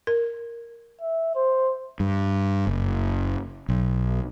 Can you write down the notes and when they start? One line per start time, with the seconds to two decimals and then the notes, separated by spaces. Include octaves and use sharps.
0.07 A#4
1.01 E5
1.36 C5
2.00 G2
2.67 F#1
3.69 B1